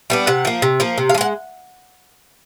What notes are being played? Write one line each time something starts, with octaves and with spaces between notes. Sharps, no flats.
G3 B3 D4
C3 F#5
F3 A#3
C3
F3 A#3
C3
F5
F3
G#3 F#5